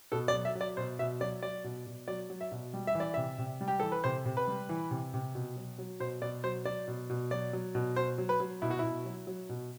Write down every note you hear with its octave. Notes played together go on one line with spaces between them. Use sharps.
B2 A4
D5
F#3
E5
F#3
D5
B2 C5
B2 E5
F#3 D5
F#3 D5
B2
B2
F#3 D5
F#3
E5
B2
G3
E5
E3
D5
C3 E5
C3
G3
G4
E3 A4
B4
C3 C5
C3
B4
G3
E3
C3
C3
B2
F#3
F#3
B2 C5
B2 D5
F#3 C5
F#3 D5
B2
B2
F#3 D5
F#3
B2
B2 C5
F#3
B4
F#3
B2 E4
F#4
B2 E4
F#3
F#3
B2